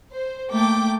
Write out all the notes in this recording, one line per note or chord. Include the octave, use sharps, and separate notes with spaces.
C5
A3 A#3 G5 D6